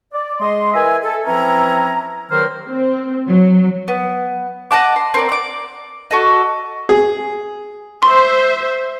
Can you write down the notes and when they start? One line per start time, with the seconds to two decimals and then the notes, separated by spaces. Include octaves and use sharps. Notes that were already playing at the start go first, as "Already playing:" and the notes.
0.13 D5
0.39 G#3 D#5 C6
0.74 E3 A#4 E5 G#5
1.03 A4
1.25 E3 F3 C4 C#4 E4 A#5
2.30 G2 D#3 F#3 A#3 C5 F6
2.67 C4
3.28 F#3
3.88 B3
4.71 D#5 F#5 A5 D6
4.96 C6
5.14 C4 A#4 D5
5.29 D5 D6
6.11 F#4 A4 D#5
6.89 G#4
8.02 C5 E5 C6 C#6